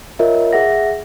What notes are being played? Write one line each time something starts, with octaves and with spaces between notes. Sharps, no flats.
F4 A#4 C#5 D#5 E5
G#4 E5 F#5 A#6